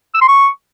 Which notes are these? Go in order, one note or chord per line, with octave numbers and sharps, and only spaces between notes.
E6
C6
C#6